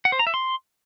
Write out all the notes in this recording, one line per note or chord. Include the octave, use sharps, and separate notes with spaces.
F#5
C5
A#5
E5
C6